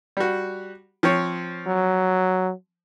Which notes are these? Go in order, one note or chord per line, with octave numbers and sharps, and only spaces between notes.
G3 F#4
F3 C4 C#5
F#3